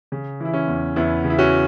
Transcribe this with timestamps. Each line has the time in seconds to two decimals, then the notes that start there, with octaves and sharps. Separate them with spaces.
0.12 C#3
0.40 E3 E4
0.54 C#4
0.68 E2
0.96 E2 B3 E4
1.24 C#3
1.30 E4
1.39 C#4 F#4